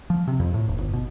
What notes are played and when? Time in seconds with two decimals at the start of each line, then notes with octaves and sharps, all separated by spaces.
0.10 F3
0.28 C3
0.40 F2
0.54 A2
0.68 D#1
0.80 G1
0.93 B2